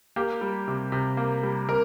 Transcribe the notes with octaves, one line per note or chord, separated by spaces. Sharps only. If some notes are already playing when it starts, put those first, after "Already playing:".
A#3 G4
G3
C3
C3
A#3
G3
C3 A#4